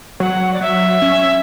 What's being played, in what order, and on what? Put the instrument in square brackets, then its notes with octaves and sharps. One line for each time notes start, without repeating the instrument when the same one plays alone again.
[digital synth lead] F#3 [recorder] F#5
[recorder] D5
[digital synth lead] F#3 [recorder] E5
[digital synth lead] C#4